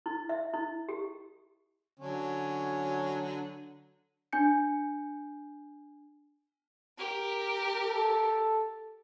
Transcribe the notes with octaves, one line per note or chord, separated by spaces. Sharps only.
E4
E5
E4
G4
D3 F#3 C#4
D4 G#5 G6 C#7
G4 A#4
A4